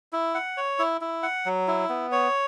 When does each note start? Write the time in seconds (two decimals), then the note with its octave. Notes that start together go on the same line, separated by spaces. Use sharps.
0.13 E4
0.35 F#5
0.57 C#5
0.79 E4
1.01 E4
1.23 F#5
1.46 F#3
1.68 E4
1.89 B3
2.12 C#5